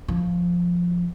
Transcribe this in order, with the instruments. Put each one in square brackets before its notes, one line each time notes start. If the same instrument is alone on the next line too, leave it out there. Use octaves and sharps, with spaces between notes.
[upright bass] F3